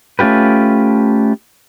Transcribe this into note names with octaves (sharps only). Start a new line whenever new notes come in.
A3 C#4 F4 G4 B4